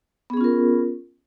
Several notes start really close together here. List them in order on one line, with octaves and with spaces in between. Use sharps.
B3 G#4 C#4 F4 A#4